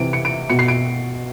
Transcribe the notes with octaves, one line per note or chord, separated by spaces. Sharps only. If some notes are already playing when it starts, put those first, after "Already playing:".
Already playing: C3 E3 D7
C#7
D7
B2 C#7
C7
D7